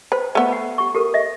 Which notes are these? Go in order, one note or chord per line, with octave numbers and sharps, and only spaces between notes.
B4 C5
A3 B3
F#5 B5
G4 C#6
G4 A4 A#4
D#5 E5